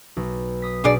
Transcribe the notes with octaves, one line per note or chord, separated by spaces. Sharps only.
B1
D#6 B6
B2 D4 G#4 D5